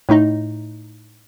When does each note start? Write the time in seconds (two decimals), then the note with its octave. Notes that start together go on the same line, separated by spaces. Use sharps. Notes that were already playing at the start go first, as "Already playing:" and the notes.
0.09 A2 A3 D#4 D#5